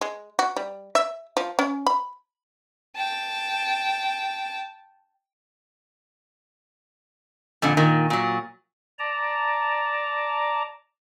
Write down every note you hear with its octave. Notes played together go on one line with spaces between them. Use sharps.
G#3
F#4
G3
E5
F3
C#4
B5
G5 A5
F2 A#2 D3
A#2 D#3
A#2 F#3
D5 A5 A#5